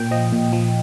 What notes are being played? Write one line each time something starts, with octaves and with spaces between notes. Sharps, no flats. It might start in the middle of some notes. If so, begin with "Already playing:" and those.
Already playing: A#2 G5
F3 D#5
A#2
F3